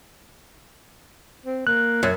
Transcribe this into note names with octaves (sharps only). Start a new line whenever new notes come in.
C4
A#3 F#6
F#2 C#5